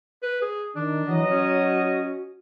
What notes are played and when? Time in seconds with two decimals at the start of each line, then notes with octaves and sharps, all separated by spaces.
0.23 B4
0.42 G#4
0.75 D#3 D4
1.08 E3 F#3 D#5
1.29 C#4 F#4